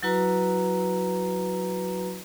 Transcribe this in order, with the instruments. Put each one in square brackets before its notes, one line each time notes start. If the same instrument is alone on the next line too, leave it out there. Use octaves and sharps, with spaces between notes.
[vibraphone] F#3 E4 F#4 B4 A#5